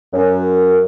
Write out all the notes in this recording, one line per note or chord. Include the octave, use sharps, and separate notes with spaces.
F#2